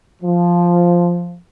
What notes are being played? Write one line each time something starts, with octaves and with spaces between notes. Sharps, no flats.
F3